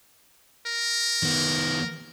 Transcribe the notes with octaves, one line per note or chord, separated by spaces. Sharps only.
A#4
D#3 B3